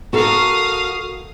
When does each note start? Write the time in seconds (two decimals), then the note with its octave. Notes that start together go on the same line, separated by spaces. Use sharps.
0.13 F#4 A4 A#4 F5 D#6